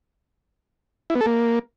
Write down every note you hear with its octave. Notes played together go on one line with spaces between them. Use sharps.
E4
B3
A4
A#3